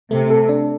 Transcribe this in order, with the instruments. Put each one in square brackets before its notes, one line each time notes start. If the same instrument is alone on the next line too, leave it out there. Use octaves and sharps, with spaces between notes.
[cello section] C3 [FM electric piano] A3
[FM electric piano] A4
D4